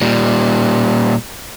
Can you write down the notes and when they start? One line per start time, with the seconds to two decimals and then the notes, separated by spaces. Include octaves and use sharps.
0.01 A#2 G3